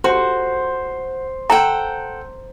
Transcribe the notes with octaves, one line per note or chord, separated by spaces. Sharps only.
F#4 C5
A4 F#5 G5 A#5